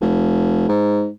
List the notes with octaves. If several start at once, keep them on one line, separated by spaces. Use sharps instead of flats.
F1
G#2